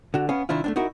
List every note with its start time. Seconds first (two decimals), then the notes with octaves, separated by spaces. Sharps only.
0.14 D3 F#4
0.29 B3 C#4 F5 G#5
0.49 C2 D#3 D4 E4 F4
0.64 A3 C4 D4
0.76 D#4 E4 F#4 A#4